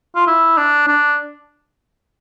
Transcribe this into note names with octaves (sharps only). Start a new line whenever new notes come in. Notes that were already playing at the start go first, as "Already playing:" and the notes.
F4
E4
D4
D4